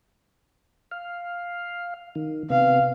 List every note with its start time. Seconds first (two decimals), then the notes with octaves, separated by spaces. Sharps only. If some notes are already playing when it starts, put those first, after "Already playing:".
0.91 F5
2.15 D#3
2.50 C3 B3 F5